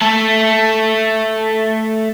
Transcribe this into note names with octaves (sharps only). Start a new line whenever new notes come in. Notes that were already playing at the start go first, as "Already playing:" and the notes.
A3 A4